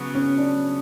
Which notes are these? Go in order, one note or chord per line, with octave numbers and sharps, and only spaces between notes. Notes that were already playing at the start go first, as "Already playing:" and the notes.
Already playing: C#3 F#3 B3
C#4
D4